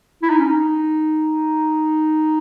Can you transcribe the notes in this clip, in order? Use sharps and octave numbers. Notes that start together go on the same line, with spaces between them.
E4
D#4
C#4
D#4